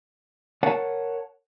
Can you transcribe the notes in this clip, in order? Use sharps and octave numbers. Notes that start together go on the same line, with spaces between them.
A#4 C#5 F#5 A5